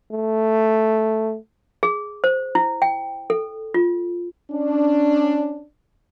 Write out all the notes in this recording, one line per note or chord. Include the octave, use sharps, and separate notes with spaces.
A3
G#4
C5
E4
G5
A4
F4
C#4 D4